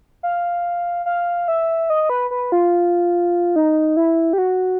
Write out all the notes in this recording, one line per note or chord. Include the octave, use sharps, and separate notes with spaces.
F5
F5
E5
D#5
B4
B4
F4
D#4
E4
G4
F#4